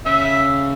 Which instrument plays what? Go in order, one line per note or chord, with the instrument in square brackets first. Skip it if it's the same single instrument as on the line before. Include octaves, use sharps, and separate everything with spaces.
[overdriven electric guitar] C#3 [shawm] E5